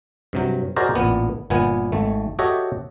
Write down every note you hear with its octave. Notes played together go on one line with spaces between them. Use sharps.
G2 C3 F#3
F#4 G#4 A#4 C5 D5 D#5
A1 A#2 B3
G1 A#2 B3 G#5
G#1 A3
F#4 G4 A4 C#5 D#5 E5